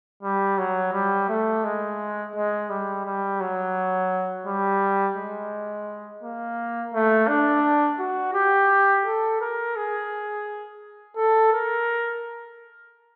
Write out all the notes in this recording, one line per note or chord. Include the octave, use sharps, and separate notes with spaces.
G3
F#3
G3
A3
G#3
G#3
G3
G3
F#3
G3
G#3
A#3
A3
D4
F#4
G4
A4
A#4
G#4
A4
A#4